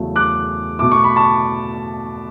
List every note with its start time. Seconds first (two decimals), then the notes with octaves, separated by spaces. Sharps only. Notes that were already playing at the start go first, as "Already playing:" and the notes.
Already playing: E2 C#3 F#3 A3
0.16 D6 F#6
0.79 B2 A3 D6
0.92 C#6
1.04 B5
1.16 A5 C#6